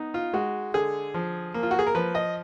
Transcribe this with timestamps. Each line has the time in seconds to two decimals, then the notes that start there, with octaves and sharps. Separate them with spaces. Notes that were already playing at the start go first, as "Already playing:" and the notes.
Already playing: B3 D#4
0.14 F4
0.34 G#3 F#4
0.74 D3 G#4
1.14 F3
1.54 A#3
1.63 F4
1.71 F#4
1.79 G#4
1.87 A#4
1.95 F3 B4
2.15 D#5